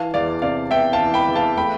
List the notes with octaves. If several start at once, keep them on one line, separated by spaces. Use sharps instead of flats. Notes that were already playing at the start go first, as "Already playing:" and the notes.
Already playing: E3 F5 A5
E2 D5 F5
C3 D5 F5
B3 E5 G5
F5 A5
E3
G5 B5
E2
F5 A5
A3 G5 B5